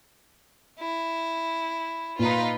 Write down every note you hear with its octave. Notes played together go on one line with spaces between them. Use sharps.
E4
A#2 D#4 F4 B4